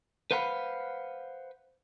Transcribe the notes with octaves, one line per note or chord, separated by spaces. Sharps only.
B4 C5 F5 F#5 A#5 B5